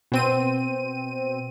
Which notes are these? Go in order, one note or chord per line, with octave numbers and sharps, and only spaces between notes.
B2 C4 D#7